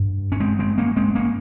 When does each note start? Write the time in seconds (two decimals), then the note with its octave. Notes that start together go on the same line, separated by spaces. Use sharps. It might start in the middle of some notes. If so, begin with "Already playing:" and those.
Already playing: G2
0.32 C#4
0.40 G#3 C4
0.59 G#3 C4
0.78 A#3 C#4
0.96 G#3 C4
1.15 A#3 C#4